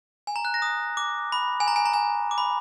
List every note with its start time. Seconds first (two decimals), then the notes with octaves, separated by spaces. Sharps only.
0.27 G#5
0.36 A#5
0.45 F#6
0.54 A#6
0.62 D#6
0.97 D6
1.32 B5
1.60 G#5
1.68 A#5
1.76 G#5
1.85 A#5
1.93 G#5
2.31 D6
2.38 B5